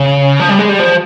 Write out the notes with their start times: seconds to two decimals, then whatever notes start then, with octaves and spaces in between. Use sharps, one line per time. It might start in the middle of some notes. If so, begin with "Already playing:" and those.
Already playing: C#3
0.40 F3
0.49 G3
0.59 G#3
0.69 G3
0.79 F3